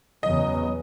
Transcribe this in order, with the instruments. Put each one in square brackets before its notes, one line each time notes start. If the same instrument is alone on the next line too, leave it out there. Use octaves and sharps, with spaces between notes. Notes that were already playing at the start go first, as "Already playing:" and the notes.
[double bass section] E2 C#3 B3 [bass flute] F#3 [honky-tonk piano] D#5